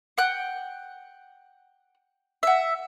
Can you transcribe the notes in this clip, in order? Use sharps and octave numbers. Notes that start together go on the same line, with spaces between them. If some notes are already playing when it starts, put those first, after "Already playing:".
F#5 G5 F#6
E5 F#5